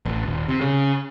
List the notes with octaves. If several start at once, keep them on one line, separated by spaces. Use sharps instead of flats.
A1
D#1
C3
C#3